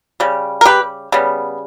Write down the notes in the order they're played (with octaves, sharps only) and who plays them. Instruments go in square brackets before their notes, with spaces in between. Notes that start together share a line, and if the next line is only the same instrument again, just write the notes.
[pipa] C#3 G3
A#4
G4 B4
C#3 G3 B3